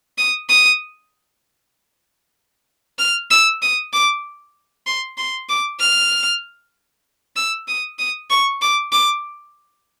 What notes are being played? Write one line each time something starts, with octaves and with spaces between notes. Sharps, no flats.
D#6
D#6
F6
E6
D#6
D6
C6
C6
D6
F6
E6
D#6
D#6
C#6
D6
D6